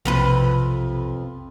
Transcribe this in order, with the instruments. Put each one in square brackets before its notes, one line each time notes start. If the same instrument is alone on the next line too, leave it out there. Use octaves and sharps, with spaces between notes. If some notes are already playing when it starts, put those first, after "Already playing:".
[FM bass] B1 [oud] F2 C3 B4